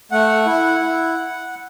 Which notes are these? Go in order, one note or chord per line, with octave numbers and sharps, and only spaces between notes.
A3 F#5
E4
E4